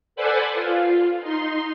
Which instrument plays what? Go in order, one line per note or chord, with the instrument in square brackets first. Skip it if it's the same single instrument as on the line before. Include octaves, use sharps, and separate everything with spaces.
[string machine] A4 B4 C5 D5 F#5 G#5
F4
D#4 C6